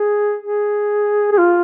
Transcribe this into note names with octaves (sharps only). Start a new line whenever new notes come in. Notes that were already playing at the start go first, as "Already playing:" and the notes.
Already playing: G#4
G#4
G#4
F4